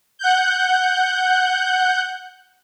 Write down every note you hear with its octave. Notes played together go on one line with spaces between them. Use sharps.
F#5 F#6 G6